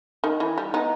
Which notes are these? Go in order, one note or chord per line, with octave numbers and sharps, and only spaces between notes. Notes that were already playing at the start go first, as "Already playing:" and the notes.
D#3
E3
G3
B3 D#4